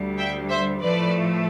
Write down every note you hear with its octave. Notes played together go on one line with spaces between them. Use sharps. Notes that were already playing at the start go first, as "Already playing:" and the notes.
Already playing: D2 D3 G3
E5 G5
C5 E5
A2 F3 A3 B4 D5